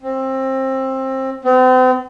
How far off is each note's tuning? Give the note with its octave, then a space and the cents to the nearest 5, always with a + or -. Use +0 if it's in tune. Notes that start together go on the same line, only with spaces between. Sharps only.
C4 +20
C4 -40